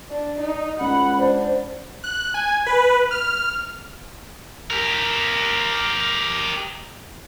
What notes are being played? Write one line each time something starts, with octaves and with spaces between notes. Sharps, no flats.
D4
D#4
C#2 F#5 B5
D4 C5
F#6
G#5
B4
F6
G4 A#4